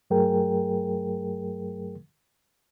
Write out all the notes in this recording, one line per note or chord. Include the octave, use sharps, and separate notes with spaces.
G2 F#3 A3 G#4 A#4 G5